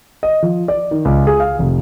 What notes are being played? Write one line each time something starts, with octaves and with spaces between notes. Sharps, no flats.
D#5
F3
D5
D#3
C#2
G#4
F5
F1